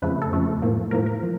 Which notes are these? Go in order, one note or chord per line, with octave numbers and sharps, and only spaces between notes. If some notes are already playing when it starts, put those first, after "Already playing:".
F2 C#3 F3 A3 B4
A4
F2 C#3 F3 A3
A2 F3 A#3
A2 F3 A#3 A#4
A#4
F3